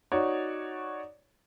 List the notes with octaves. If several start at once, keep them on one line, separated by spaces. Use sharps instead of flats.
D#4 F#4 C#5 D5